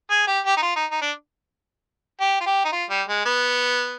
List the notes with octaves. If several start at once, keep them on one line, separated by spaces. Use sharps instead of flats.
G#4
G4
G4
D#4
F4
D#4
D#4
D4
G4
F4
G4
D#4
F4
G3
G#3
B3